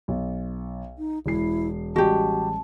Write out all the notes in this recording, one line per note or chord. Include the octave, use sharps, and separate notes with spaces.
B1
D#4
E1 E4 C7
A1 G3 G#3 F#4 G4 A5